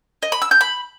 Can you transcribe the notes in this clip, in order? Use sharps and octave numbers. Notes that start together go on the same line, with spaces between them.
D#5
B5
E6
G6
B5